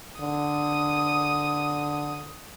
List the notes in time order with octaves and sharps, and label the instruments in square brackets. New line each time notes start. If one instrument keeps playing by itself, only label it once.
[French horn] D3 [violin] D#6